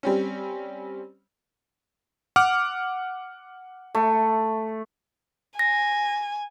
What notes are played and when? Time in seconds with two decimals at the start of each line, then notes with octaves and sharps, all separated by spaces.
0.03 G3 C4 C#4
2.36 F#5 D6 F6
3.95 A3
5.59 G#5 A#6